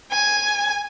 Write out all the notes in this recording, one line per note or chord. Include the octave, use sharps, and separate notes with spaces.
G#5